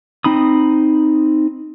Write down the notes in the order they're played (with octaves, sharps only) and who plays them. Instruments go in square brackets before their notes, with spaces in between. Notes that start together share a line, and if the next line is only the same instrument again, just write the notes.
[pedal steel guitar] C4 D#4 B5 D#6